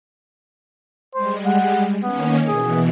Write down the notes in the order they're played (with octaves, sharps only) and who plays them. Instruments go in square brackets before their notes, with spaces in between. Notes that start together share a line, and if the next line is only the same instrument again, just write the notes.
[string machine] G3 G#3 [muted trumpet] C5
[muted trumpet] F#5
[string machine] D#3 A#3 C#4 [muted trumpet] B3
[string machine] B2 E3 [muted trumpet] G#4